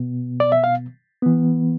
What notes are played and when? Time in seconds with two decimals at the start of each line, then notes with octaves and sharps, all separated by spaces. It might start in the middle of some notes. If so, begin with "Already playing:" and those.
Already playing: B2 B3
0.40 D5
0.52 E5
0.64 F5
1.22 E3 B3